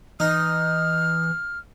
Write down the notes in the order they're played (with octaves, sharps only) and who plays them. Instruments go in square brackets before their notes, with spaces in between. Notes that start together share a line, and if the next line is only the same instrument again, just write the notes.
[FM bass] E3 [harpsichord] D#4 [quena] F6